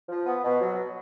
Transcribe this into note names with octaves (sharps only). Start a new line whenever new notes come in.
F3
B3
B2
F#3